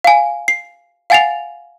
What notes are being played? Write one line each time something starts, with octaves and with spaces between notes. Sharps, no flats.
F5 G#5
C7
F5 F#5 G#5 A6 C7 F7